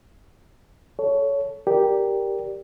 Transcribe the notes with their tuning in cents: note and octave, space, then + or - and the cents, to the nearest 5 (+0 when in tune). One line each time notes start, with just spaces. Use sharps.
A4 -5 C#5 +15
G4 +0 A#4 +0 D5 +0